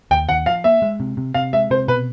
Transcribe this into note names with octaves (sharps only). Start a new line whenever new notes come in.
D#2 G5
D#2 F#5
F3 F5
A#3 E5
G#3
C3
C3
C3 F5
G#3 E5
C3 C5
B2 B4